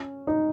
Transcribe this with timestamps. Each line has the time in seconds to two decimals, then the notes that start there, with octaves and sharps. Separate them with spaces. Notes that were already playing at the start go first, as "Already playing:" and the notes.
Already playing: C#4
0.27 D#4